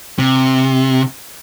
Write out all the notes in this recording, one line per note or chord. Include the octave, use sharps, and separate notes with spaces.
C3